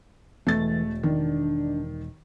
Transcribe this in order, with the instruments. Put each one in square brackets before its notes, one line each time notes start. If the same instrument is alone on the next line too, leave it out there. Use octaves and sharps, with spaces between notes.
[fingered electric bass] E1 [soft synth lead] E3 [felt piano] A3 A6
[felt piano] D#3 [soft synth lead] D4